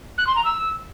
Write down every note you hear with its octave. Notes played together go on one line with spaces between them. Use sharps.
F#6
C6
A#5
E6